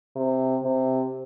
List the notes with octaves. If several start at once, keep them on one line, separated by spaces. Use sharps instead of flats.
C3
C3